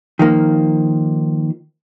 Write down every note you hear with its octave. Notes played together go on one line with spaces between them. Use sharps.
D#3 F3 A#3